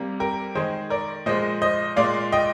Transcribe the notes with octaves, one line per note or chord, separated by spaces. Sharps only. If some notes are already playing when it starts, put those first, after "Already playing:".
Already playing: C3 G3 A#3
G4 A#4
D#3 G#3 G#4 C5
A#4 D5
A#2 F3 G#3 C5 D#5
C5 D#5
A#2 G#3 D5 F5
D#5 G5